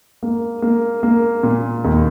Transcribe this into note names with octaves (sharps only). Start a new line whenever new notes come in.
A#3
A#3
A#3
A#2
D#2